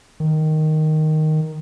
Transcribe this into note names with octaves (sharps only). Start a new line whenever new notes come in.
D#3